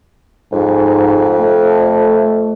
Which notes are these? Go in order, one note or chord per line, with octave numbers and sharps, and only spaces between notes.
F2 G#2
A3